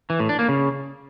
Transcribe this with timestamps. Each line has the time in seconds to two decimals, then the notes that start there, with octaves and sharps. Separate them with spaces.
0.10 E3
0.19 A2
0.29 D4
0.39 A#3
0.49 C#3